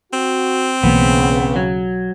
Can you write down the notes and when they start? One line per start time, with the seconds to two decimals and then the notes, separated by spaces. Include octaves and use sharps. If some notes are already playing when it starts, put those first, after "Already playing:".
0.13 C4 F#4
0.83 B1 C#3 E3 A#3 B3
1.56 F#3